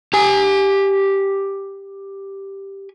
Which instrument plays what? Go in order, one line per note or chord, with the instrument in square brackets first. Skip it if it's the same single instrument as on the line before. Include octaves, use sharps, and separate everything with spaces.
[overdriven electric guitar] G4 G#5